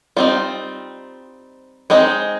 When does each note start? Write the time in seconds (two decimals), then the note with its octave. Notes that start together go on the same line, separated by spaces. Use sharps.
0.17 G3 C4 D#4 F4
1.90 G#3 C4 D#4